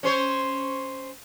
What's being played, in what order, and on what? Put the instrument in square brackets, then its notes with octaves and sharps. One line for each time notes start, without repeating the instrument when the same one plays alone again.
[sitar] C#4 C5 C#5